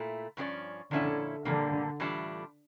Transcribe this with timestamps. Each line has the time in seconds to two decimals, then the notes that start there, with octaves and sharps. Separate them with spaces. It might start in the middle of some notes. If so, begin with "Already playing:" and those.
Already playing: A#2 A3 E4
0.37 G2 F3 C#4 G4 D5
0.91 A#2 D3 F3 C#4 E4 A4
1.45 A#2 D3 G3 A#3
2.00 A2 E3 G3 D4 F4